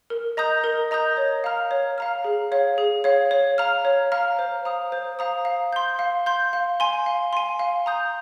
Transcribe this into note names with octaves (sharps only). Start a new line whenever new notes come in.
A#4
D#5 A#5 D#6 G6
A#4
D#5 A#5 D#6 G6
C#5
F5 A#5 F6
C#5
F5 A#5 F6
G#4
C#5 F5
G#4
C#5 F5
C#5
F5 A#5 F6
C#5
F5 A#5 F6
C5
F5 A#5 D#6
C5
F5 A#5 D#6
F5
C6 G6
F5
C6 G6
F5
G#5 C6
F5
G#5 C6
F5
A#5 D#6 G6